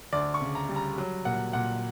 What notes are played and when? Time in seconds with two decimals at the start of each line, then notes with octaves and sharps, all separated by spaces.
0.13 D2 D5
0.34 C#6
0.41 C#3
0.55 A#5
0.69 G3
0.76 A#5
0.98 F#3
1.25 A#2 F#5
1.53 A#2 F#5